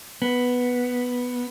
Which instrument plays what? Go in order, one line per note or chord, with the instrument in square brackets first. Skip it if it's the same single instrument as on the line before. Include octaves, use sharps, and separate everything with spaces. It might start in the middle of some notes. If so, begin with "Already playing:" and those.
[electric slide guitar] B3